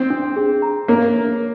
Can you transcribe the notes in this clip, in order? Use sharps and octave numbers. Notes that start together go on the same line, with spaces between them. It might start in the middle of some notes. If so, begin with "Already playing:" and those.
Already playing: C4
D4
G#4
A#5
A#3 C#5
C#5